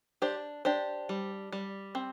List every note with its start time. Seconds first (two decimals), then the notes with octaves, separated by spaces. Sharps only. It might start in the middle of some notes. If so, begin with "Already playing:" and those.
0.22 D4 G4 C5
0.65 D4 G4 C5
1.09 G3
1.52 G3
1.95 C4